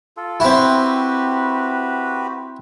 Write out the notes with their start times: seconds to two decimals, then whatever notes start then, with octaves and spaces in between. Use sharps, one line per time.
0.17 F4 A4
0.40 C4 E4 F#4 G4 B4